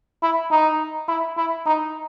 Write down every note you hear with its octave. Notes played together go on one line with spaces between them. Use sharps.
E4
D#4
E4
E4
D#4